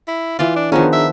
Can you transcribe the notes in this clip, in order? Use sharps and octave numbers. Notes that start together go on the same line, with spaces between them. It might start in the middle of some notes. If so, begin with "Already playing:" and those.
E4
E3 F4 D5
D4
D#3 F3 B3 C#4 D4 G#4 A#5
E5